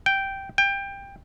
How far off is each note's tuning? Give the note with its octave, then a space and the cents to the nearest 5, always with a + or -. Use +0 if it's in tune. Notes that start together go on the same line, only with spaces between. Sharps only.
G5 -5
G5 +20